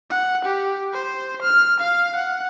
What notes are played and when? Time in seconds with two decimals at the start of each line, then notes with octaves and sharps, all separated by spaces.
0.10 F#5
0.45 G4
0.93 C5
1.42 F6
1.80 F5
2.16 F#5